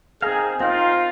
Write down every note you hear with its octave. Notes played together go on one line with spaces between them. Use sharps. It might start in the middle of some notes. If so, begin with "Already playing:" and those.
C4 D#4 G#4 A#4 F5
C4 D#4 F4 A#4 F5